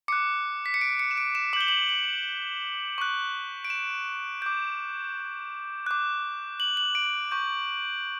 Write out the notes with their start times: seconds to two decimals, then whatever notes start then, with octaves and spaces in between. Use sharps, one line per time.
0.08 D6 F#6 C#7
0.66 B6
0.74 C#7
0.81 D7
0.99 C#7
1.11 E7
1.17 D7
1.35 E7
1.53 D6 F#7
1.56 G6 G7
1.68 F#7
1.89 F#7
2.98 C#6 F#6
3.65 D7
3.70 E7
4.42 D6 G6
5.86 D6 F#6
6.60 F#7
6.77 F#7
6.95 D7
7.31 C#6 G6